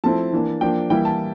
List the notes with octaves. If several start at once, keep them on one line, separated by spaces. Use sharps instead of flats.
F3 A3 C4 E4 A5
E3 A#3 D4
F3 A#3 D4 G5
E3 G3 A#3 E4 G5
A5